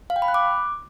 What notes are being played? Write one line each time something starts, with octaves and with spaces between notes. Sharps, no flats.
F5
G5
B5
F#6
D6